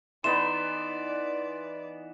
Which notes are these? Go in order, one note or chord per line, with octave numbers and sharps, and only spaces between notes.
E3 B3 D#4 D5 C6 E7